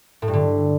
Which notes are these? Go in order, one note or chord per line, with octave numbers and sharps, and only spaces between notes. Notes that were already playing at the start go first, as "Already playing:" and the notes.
A2
G2
D3